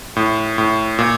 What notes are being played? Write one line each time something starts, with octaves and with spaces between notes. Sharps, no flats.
A2
A2
A#2